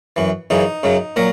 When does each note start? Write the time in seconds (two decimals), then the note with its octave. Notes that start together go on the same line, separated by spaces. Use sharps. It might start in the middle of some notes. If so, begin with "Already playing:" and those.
0.16 F#2 E3
0.50 F#2 C#3 E3 D#4
0.83 F#2 C#3 F#3
1.16 A#2 F#3 A#4